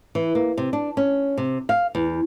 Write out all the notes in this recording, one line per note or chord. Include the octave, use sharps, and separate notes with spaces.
E3
A#3
C3
D4
C#4
C3
F5
E2